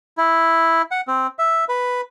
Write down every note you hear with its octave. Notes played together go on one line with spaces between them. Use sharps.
E4
F#5
C4
E5
B4